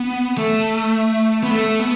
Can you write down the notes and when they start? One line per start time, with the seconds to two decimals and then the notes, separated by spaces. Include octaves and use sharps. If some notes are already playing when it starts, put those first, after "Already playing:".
Already playing: B3
0.38 A3
1.43 B3
1.51 A3
1.80 B3